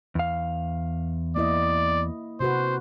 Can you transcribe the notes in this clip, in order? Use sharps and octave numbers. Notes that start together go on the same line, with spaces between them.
E2 F5
A#3 E4 D5 D#5
C3 F#4 B4 C5